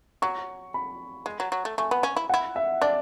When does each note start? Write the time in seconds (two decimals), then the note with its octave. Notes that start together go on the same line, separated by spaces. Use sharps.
0.22 F#3 C#6
0.74 B5
1.26 G#3
1.40 F#3
1.52 F#3
1.65 A3
1.78 A3 G#5
1.91 B3
2.03 C#4
2.16 E4
2.29 E4 F#5
2.56 E5
2.81 D4 D5